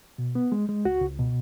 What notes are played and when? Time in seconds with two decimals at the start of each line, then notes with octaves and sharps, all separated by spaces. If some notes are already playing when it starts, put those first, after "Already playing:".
0.18 B2
0.35 B3
0.52 G#3
0.69 G#3
0.85 C#2 F#4
1.02 C#2
1.19 B2